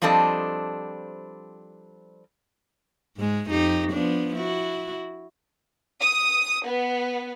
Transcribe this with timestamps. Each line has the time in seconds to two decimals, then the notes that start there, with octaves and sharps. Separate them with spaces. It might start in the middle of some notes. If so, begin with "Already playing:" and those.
0.02 F3 G3 C4 D4 A4 D#5
3.17 G#2 G#3
3.50 F2 D#4 G4
3.92 F3 B3 D4
4.36 E4 F#4
6.02 D#6
6.67 B3